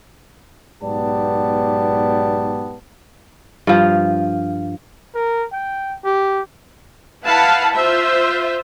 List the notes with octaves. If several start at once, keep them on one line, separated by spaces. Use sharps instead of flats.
B1 G#2 B3 G4 D5 A5
G2 F3
A#4
G5
G4
E4 B4 F5 F#5 A5 B5
F4 C5 E5